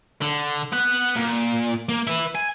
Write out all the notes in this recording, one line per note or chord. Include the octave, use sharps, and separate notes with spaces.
D3
B3 F#5
A#2
A#3
E4 B4
G#5